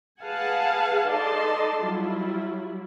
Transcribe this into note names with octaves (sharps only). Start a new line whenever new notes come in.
G#4 B4 F5 F#5 G#5 A5
D#4 A4 D5 D#5 A5 C6
F#3 G3 E4 F4